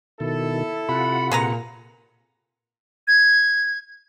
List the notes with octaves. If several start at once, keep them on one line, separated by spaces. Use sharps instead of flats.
B2 D#3 E4 A4
C3 F4 F#5 B5
A#2 G#4 B4 A#5
G#6